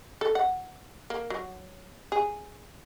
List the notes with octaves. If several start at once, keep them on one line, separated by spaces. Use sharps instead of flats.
A4
F#5
A#3
F#3
G#4